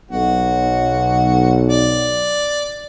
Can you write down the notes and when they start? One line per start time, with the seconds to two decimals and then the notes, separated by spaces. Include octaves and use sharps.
0.11 B1 F#4
1.69 D5